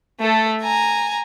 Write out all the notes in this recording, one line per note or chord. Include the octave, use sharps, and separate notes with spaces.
A3 A4
G#5 A#5